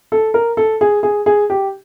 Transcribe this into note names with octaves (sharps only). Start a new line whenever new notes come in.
A4
A#4
A4
G#4
G#4
G#4
G4